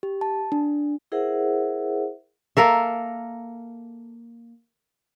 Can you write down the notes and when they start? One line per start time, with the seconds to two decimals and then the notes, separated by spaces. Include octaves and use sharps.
0.03 G4
0.21 A5
0.52 D4
1.12 E4 G#4 A#4 C5 E5 F#5
2.57 A#3 A4 A#4 E5